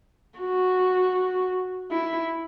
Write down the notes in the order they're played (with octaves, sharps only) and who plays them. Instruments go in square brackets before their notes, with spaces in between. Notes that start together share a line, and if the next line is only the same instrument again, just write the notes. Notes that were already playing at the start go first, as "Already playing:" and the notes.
[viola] F#4
E4